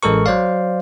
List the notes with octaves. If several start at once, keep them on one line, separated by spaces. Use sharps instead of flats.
A1 G#3 A4 A#4 C#6
F#3 C5 D5 F5